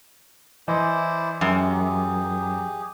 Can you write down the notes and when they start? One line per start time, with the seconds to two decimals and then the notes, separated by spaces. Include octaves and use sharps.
0.68 E3 E4 C5 D5 D#5
1.41 F#2 G4 G#4